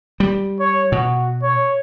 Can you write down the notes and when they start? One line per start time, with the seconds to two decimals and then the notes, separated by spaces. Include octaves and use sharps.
0.20 G3
0.60 C#5
0.92 B2 F#4
1.43 C#5